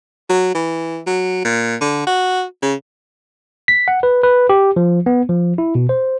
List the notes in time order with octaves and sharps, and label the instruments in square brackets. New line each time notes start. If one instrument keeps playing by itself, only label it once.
[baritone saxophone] F#3
E3
F#3
A#2
D3
F#4
C#3
[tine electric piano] B6
F#5
B4
B4
G4
F3
B3
F3
E4
B2
C5